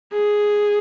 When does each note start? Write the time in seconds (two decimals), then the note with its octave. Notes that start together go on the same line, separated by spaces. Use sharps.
0.13 G#4